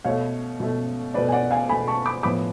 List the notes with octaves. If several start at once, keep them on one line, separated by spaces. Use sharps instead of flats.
B2 A3 C#5 F5
B2 A3
B2 A3 B4 D5
G#5
D5 F#5
F5 G#5
B2 A3 G#5 B5
A5 C#6
B5 D6
A2 F3 B3 B5 D6